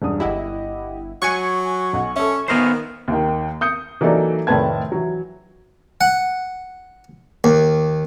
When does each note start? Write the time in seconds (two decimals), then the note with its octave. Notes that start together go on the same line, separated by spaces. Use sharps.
0.02 E1 G2 D#6
0.20 G1 E4 G4 D#5 F#5
1.22 F#3 G#5 C#6 F#6 G#6 C#7
1.93 B1 F#5
2.16 C#4 A4 E5
2.48 D#3 B3 A#4 C5
3.08 D#2 D#3
3.61 D#6 G6 C#7
4.01 E3 F#3 A#3 D#4 A4 D5
4.47 F1 A2 D#3 B4 A5 G#6
4.92 E3 F#3
6.01 F#5
7.44 D#2